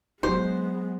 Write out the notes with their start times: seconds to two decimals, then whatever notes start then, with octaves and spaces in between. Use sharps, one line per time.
0.23 F#3 G#3 B3 D4 D#4 F#4 G4 C5